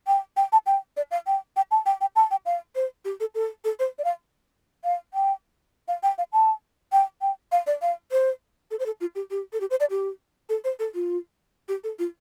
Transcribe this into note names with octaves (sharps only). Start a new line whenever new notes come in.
G5
G5
A5
G5
D5
F5
G5
G5
A5
G5
G5
A5
G5
F5
C5
G4
A4
A4
A4
C5
D5
F5
F5
G5
F5
G5
F5
A5
G5
G5
F5
D5
F5
C5
A4
C5
A4
F4
G4
G4
A4
G4
C5
D5
G4
A4
C5
A4
F4
G4
A4
F4